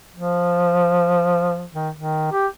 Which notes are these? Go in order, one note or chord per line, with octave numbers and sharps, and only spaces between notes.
F3
D#3
D#3
G4